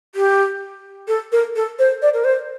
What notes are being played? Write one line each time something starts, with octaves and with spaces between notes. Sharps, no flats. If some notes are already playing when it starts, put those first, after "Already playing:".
G4
A4
A#4
A4
C5
D5
A#4
C5